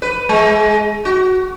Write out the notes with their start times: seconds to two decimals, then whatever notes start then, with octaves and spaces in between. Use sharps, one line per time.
0.02 B4
0.29 G#3
1.05 F#4